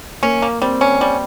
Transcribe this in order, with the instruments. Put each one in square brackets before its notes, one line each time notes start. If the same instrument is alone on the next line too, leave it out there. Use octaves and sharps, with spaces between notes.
[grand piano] A#3 [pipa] C#4
[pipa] A#3
[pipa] G3 [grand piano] C4
[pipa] C#4
G3